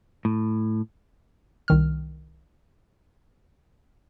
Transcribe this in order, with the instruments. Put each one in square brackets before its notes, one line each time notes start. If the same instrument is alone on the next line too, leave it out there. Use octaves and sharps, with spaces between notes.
[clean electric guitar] A2
[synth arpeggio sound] C2 D#3 F6